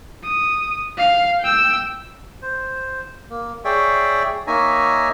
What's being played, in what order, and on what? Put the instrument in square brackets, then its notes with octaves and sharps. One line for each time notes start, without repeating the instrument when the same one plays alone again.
[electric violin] D#6
F5
G5 E6
[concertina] C5
A#3
G#4 C#5 D5 E5 G5
A#3 D#4 C#5 E5 G#5 A#5